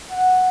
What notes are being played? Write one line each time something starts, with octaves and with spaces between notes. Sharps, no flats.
F#5